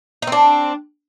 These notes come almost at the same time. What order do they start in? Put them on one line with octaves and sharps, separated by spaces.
D#4 C4 D4